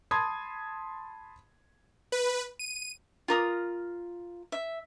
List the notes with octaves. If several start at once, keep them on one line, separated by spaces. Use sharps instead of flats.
A5 B5 C6 D#6 G#6
B4
D#7
F4 A#4 D#6
E5